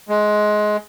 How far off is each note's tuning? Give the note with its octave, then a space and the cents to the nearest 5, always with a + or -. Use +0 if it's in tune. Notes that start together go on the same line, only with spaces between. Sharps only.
G#3 +20